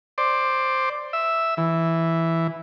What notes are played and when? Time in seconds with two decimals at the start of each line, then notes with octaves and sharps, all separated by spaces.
0.18 C5 D5
1.13 E5
1.57 E3